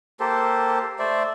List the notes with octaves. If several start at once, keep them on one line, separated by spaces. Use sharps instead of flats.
A#3 G4 A4 C5
A3 C5 D5 E5